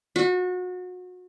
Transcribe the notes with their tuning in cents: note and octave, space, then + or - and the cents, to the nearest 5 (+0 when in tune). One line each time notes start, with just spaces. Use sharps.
F#4 -30